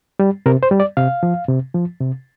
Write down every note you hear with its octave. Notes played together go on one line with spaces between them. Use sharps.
G3
C3 A#4
C5
G3
D5
C3 F5
F3
C3
F3
C3